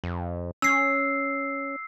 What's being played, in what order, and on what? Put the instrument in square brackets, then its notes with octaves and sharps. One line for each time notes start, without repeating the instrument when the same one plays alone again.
[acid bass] F2
[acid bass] C#4 [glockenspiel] E6 C7